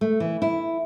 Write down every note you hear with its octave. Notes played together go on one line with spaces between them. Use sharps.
A3
E3
E4